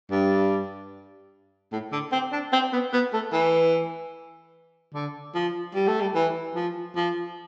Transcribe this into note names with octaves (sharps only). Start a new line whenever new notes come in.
G2
A2
D3
C4
D4
C4
B3
B3
A3
E3
D3
F3
G3
A3
G3
E3
F3
F3